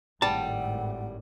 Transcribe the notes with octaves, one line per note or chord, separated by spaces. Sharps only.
G#1 A2 G3 F#5 A5